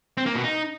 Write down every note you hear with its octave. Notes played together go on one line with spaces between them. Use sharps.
C4
A#3
B2
D#4